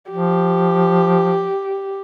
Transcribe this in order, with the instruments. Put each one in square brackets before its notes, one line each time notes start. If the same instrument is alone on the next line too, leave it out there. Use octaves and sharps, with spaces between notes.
[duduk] F3 [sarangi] G4